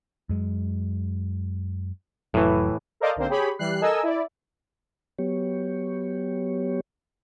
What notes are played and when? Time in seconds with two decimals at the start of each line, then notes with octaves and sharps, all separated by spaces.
0.29 F#2 G#3
2.34 F1 A2 E3 F#3
3.00 A4 A#4 C5 D5 D#5 F5
3.16 B1 D3 A#3 C4 C5
3.29 G4 G#4 C#5 B5
3.59 E3 G3 F#6 C7
3.81 A4 A#4 D#5 G#5 E6
4.03 E4 D5
5.19 F#3 B3 G4 C#5